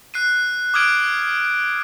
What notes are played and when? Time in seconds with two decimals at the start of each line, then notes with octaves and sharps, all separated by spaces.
0.14 F#6 C7 D#7
0.74 D6 D#6 F6 G#6 D7 D#7